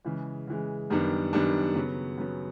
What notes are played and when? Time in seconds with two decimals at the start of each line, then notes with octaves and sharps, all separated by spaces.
0.05 C#3 E3 G#3
0.47 C#3 E3 G#3
0.90 F#2 D#3 G3 B3 D4
1.33 F#2 D#3 G3 B3 D4
1.75 C#3 F#3 B3
2.18 C#3 F#3 B3